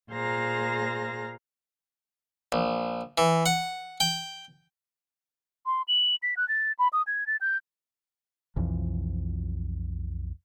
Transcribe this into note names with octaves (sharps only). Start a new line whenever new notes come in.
A#2 G#4 C5 F5 A#5 A#6
A#1
E3
F#5
G5
C6
F#7
B6
F#6
A6
B5
D#6
G#6
A6
G6
B1 F2 E3 F3